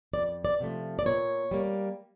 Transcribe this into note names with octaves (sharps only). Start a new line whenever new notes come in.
F2 D5
D5
C3 F3 A3
D5
A#2 C#5
G3 A#3